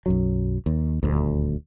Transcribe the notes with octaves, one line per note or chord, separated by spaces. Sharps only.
B1 F#2 F#3
D#2
D#1 G#1 D2